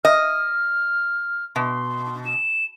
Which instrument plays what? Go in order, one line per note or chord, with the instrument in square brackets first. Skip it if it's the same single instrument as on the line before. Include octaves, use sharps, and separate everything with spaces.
[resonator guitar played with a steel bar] D#5 [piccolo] F6
[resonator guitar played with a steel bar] B2 [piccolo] C6
[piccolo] E7